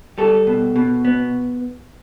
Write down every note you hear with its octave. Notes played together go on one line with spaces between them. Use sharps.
G3 A4
B2
B2
B3